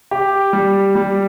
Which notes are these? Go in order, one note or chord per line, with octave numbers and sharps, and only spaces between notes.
G4
G3
G3